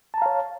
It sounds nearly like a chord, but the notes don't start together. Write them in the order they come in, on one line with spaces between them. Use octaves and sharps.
A5 A#5 F5 C#5